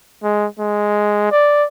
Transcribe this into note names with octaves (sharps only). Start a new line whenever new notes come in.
G#3
G#3
D5